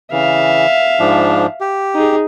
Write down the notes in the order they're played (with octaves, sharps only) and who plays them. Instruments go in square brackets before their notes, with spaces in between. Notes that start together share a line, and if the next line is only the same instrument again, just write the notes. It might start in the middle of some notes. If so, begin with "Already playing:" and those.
[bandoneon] C#3 E3 [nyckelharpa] E5 F5
[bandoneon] G#2 F3 D4
G4
[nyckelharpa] D#4 G#4